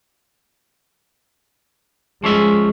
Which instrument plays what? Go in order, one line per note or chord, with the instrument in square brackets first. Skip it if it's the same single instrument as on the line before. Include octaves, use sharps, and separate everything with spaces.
[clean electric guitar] F3 C#4 E5 [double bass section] G#3